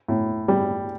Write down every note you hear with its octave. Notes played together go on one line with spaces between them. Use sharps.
A2
G3